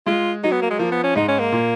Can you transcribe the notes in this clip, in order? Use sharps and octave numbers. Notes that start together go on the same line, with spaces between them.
G#3 F4
F#3 D#4
B3
A#3
G#3
F3 A#3
B3
C#4
G#2 D#4
C#4
A#3
A#2